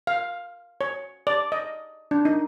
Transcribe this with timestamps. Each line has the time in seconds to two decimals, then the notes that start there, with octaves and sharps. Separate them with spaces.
0.07 F5
0.81 C#5
1.27 D5
1.52 D#5
2.11 D4
2.25 D#4